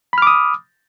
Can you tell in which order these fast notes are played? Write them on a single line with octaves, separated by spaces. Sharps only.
B5 F6 D6 D#6